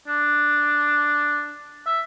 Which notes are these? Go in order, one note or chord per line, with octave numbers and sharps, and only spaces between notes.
D4
E5